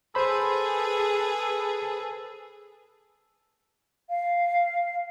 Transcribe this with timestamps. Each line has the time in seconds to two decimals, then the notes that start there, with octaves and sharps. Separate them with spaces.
0.15 G#4 A4 B4 C5 B5
4.10 F5